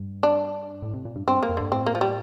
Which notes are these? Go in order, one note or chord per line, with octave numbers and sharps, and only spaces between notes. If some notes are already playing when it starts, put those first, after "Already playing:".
Already playing: G2
D4
A2
C3
A#2
G2
G2 C4
A#3
F2
G2 D3
A2 C4
A#3
F3
G3